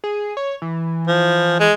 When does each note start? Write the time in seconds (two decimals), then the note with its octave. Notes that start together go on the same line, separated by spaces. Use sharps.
0.04 G#4
0.37 C#5
0.62 E3
1.07 F3
1.60 G#3